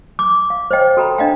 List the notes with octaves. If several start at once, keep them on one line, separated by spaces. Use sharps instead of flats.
D6
F5
C5 C#5 D#5 G5
F#4 A4 G5 A#5 B5
D4 D#5 F5 G5